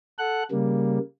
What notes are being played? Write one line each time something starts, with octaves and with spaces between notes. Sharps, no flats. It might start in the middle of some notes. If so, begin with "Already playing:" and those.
A4 F#5 F#6
C#3 G3 A#3